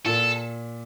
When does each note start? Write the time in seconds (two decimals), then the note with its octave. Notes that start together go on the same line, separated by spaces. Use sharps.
0.06 A#2 A4